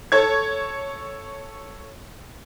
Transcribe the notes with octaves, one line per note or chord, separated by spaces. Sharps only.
A4 C#5 G#6